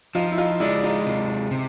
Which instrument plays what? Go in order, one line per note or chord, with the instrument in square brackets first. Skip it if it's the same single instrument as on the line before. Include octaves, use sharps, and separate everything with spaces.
[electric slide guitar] F3 [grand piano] D#4 F4
[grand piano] E4
D#4 F4
[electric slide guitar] G#3 [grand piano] D4 E4
[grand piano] D#4 F4
[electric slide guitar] C3
C3